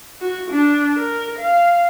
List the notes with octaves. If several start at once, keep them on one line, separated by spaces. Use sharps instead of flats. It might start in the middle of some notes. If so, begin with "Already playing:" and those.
F#4
D4
A#4
F5